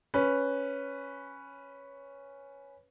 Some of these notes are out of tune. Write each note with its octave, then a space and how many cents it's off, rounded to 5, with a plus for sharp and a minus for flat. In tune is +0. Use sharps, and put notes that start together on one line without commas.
C#4 +0 B4 +0